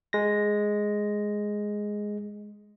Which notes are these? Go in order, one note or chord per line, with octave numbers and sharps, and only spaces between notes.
G#3 A#6